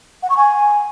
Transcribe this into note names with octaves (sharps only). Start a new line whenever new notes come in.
F#5
C#6
G#5